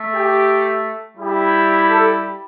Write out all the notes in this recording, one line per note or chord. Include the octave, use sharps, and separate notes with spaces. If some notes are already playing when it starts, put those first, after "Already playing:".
Already playing: A3
G4
G3 E4 G4
A4